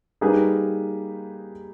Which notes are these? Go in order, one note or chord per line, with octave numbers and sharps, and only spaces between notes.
G3 A#3 D#4 G#4 B4